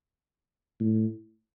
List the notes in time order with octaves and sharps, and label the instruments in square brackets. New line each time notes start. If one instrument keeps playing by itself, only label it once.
[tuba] A2